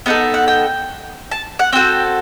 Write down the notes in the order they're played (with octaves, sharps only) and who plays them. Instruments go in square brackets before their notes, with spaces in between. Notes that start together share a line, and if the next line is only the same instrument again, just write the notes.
[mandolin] B3 D#4 A4 F#5
F#5
G5
A5
F#5
C4 F#4 A4 G5